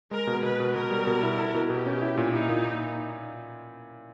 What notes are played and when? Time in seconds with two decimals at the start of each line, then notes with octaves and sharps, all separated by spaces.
0.11 G#3 A#4
0.27 B2
0.43 B2 B4
0.60 B2
0.75 B2 A#4
0.91 G3
1.07 B2
1.23 E4
1.38 E4
1.54 B2
1.70 B2 G4
1.86 C#4
2.02 E4
2.17 A#2
2.33 D#4 E4
2.49 A#2